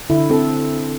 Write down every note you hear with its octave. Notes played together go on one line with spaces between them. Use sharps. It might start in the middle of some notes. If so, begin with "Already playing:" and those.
D3 E4
C4 A4